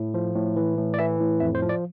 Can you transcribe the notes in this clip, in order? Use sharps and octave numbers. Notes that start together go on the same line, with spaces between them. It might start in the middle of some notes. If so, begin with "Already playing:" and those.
Already playing: A2
F3
A2
E3
A2
D5
E3 E5
A2
F2 E5
C5
F3
D5